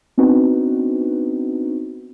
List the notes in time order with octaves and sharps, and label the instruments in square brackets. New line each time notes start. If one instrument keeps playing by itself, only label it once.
[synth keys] B3 C4 D4 D#4 F#4 B4